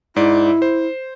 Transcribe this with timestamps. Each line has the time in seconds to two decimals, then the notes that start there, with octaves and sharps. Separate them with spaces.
0.16 G#2 E4 D5
0.62 C5